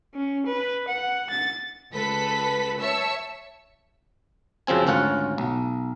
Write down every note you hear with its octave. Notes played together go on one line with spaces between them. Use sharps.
C#4
B4
F#5
A6
C#2 A4 B4 B6
C#5 E5 A5 E6 C#7
F#2 C#3 F3 C4 G#5
G#1 D2 C#4 F4 F#5
B1